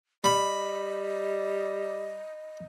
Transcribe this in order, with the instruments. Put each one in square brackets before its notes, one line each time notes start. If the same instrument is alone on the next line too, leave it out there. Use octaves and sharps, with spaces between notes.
[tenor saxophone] G3 [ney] D#5 [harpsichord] B5